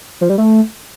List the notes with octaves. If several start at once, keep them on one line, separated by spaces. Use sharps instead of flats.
F3
G3
A3